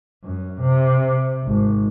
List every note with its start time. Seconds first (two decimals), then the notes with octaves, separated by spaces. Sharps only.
0.24 F#2
0.60 C3
1.44 G#1